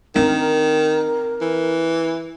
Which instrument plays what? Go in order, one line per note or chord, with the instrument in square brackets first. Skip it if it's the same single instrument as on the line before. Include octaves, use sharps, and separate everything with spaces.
[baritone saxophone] D#3 [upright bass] C4 D4 [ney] A#4
[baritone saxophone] E3